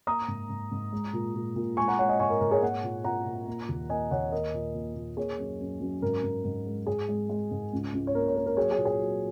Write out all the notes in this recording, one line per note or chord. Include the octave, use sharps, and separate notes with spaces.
A#3 A#5 D#6
G#2
G#2
G#2
G#3
A#2
A#2
A#2
G#3 G#5 C#6
F#5 A#5
G#3 C#5 F#5
D#5 G#5
G#2 G#5 C#6
A#4
G#2 A#4
G#4 C#5
A#3 C#5 F#5
A#2
A#2 F#5 A#5
A#2
A#3
D#2
A#3 D#5 G#5
D#2 C#5 F#5
A#3 A#4 D#5
A#2
A#2
A#2
A#3 G#4 C#5
F#2
F#2
F#2
G#2 A#4
G#2
G#2
G#3
G#2 G#4
G#3
G#3
G#2
C#2
C#2
C#5
A#3 A#4
C#5
A#3 A#4
A#4
F#3 G#4 C#5
G#4 C#5
A#2
G#4
F#3